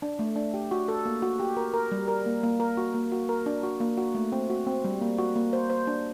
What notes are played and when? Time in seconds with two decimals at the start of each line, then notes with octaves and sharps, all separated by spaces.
0.02 D4
0.19 A3
0.36 D4
0.54 G4
0.71 F#4
0.88 A4
1.05 A#3
1.22 F#4
1.40 G4
1.57 A#4
1.74 A#4
1.92 G3
2.08 A#4
2.26 A#3
2.43 A#3
2.60 A#4
2.77 F#4
2.94 A#3
3.12 F#4
3.29 A#4
3.46 D4
3.63 F#4
3.80 A#3
3.97 F#4
4.15 A3
4.32 C4
4.50 F#4
4.67 C4
4.84 G3
5.01 A#3
5.18 F#4
5.36 A#3
5.53 C5
5.70 C5
5.87 D4